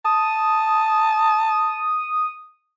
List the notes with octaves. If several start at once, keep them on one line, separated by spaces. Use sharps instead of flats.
A5 D#6